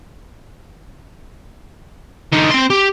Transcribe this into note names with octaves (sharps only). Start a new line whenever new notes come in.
D3 D#4
C4 C6
G4